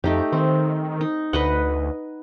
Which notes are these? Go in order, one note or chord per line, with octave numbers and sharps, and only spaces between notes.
F2 A3 D#4 G4
D#3 C4
D#4
D2 B4 D#5 F#5